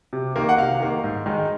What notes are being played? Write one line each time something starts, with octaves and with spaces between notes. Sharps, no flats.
C3
D#3 A#3
F#5
C3 F5
D#3 A#3
G#2
D#3 G#3 D#4